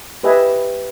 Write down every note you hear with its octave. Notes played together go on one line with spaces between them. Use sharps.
G4 B4 D#5 E5 G#5